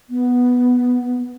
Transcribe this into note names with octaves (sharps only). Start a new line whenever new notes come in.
B3